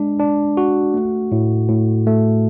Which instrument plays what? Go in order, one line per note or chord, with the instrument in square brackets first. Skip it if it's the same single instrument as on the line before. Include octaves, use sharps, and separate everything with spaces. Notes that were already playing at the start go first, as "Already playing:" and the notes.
Already playing: [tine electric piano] G#3 D4
D4
F#4
A3
A2
A2
A3